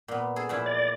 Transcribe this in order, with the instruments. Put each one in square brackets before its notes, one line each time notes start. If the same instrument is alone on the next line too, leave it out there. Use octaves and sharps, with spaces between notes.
[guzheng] A#2 B3
G#4 A4
A#2 F3 E4
[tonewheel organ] D5